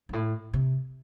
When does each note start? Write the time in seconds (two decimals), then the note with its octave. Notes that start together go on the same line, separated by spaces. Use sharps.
0.09 G2
0.13 A2
0.53 C3